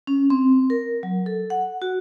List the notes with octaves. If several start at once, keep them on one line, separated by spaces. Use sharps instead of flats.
C#4
C4
A#4
F#3
A4
F#5
F#4